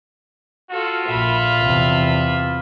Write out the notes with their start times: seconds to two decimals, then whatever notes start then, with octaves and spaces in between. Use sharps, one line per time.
0.71 F4 F#4 A4
1.08 A#1 A#2 E5 B5
1.62 E2 C3